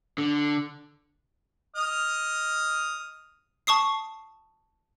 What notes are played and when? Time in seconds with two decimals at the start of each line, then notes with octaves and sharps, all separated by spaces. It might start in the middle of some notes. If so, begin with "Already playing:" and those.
0.18 D3
1.76 D#5 D#6 F6
3.67 A5 C#6 D#6 C7